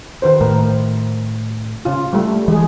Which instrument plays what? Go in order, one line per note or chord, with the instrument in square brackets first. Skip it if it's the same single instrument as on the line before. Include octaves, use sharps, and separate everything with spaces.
[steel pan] D#3 B4 C5
[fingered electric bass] A2 [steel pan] A#4
[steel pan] C#3 F4
G3 A3
[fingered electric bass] E3 [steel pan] G#3 G#4